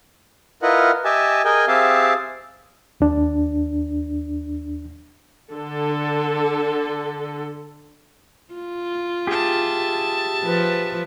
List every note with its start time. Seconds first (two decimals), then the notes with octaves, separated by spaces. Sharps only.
0.62 E4 F4 A#4 B4 D#5 F#5
1.05 G4 D#5 E5 G#5 A5
1.45 G#4 A#4 D#5 G5 G#5
1.68 C4 G4 G#4 E5 F5 A5
3.00 D#2 D4
5.52 D3 A4
8.54 F4
9.27 G4 G#4 E5 A5
10.44 F3 B4